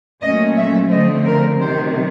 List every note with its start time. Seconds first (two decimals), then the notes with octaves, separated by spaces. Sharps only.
0.22 A#2 F#3 A3 C#4 D#5
0.57 E5
0.91 D3 F3 A3 C4 D#5
1.26 A#4
1.60 C3 D#3 F#3 C5